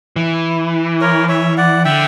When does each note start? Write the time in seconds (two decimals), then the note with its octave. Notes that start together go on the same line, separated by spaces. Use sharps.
0.16 E3
1.01 A#4 C#5
1.29 C#5 E5
1.57 D5 F#5
1.85 D3 E5 G5